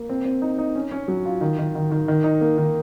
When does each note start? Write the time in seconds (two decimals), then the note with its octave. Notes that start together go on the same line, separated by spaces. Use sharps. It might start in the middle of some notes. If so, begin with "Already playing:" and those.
Already playing: A#3
0.09 C4
0.25 C4
0.42 D#4
0.58 D#4
0.75 C#4
0.92 C#4
1.08 F#3
1.25 F4
1.41 D#3
1.59 D#3
1.75 D#3
1.92 D#3
2.08 D#3
2.24 D#4
2.41 A#3
2.58 D#3